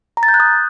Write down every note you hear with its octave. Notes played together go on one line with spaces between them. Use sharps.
A#5
A6
G6
F#6
D#6